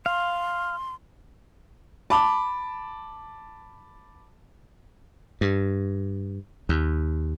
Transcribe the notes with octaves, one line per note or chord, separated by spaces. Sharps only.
F5 C6
A5 B5 D6
G2
D#2